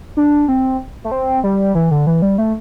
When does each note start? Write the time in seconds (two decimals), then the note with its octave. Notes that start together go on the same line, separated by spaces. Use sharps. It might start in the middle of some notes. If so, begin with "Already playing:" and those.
0.17 D4
0.48 C4
1.04 A3
1.12 C4
1.44 G3
1.75 E3
1.91 D3
2.07 E3
2.22 G3
2.38 A3